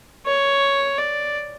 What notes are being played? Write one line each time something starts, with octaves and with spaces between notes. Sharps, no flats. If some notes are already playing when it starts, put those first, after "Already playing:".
C#5
D5